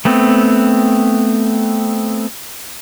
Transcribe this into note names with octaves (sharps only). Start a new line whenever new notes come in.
A3 B3 C4